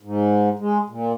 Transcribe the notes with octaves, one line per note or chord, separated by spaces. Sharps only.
G#2
G#3
A#2